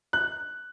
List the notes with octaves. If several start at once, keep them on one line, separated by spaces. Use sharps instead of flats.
F#6